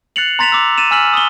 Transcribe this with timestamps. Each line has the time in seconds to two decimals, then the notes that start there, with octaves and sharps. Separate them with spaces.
0.16 F#6 A6 C7 C#7 F7 F#7
0.39 A#5 C6 A6 B6 E7 F7
0.52 D6 E6
0.78 A6 D#7 E7
0.91 G#5 E6 F6 B6 F#7
1.13 D#6 G7